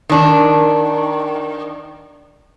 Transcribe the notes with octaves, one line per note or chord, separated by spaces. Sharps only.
D#3 D4